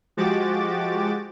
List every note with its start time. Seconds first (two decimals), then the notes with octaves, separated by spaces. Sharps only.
0.17 F3 G#3 F#4 G4 D6 A6